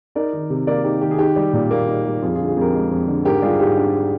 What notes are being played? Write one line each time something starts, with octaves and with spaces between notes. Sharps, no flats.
D#4 A#4 D5
D#3
C3
A#3 A#4 D5
D#4 G4
D#3 G4
G#4
D#4 G4
G3
A#2
A#3
D#4
G3
F2 F4 G#4
F4 G#4
D3
F4 G#4
F2 G4 A#4
G#3
F2
D3
G#2 G4 A#4
G3 F4 G#4
G#2 G4
D4